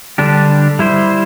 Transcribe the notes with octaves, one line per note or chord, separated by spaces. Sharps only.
D3 G3 D4 G4
G3 E4 C5